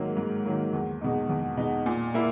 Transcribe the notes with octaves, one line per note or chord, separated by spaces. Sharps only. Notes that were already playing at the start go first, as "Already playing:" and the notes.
Already playing: G#2 D#3 F#3 A#3
G#2
D#3 F#3 A#3
E2
B2 G#3 D#4
E2
B2 G#3 D#4
A#2
A#3 E4